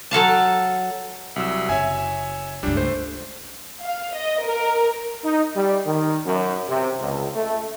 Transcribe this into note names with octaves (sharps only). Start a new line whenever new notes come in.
F#3 A4 F5 A5
C2 F#3 E6
F#1 C#5 E5 G#5
C#2 G2 G3 D4
A3 C5
F5
D#5
A#4
D#4
G3
D#3
F#2
C3
C#2
A3